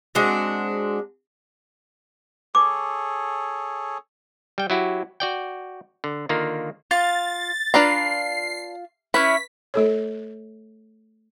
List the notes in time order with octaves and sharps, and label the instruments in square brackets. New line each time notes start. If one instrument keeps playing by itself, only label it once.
[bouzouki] G#3 C4 D4 F#4
[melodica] G#4 A4 C#5 [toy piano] D6
[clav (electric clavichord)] G3 G5
F#3 E4 F#4 G4
F#4 D5 G5
D3
D3 D#3 A#3 F4
[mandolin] F4 [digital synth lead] A6
[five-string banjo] D4 B4 A#5 [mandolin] F4 [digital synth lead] C7
[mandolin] C#4 E4 [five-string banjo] B4 [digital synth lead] B6
[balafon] A3 A4 C#5